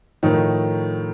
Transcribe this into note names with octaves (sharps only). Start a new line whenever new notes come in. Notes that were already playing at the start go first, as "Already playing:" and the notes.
A2 D#3 F3 A3 D#4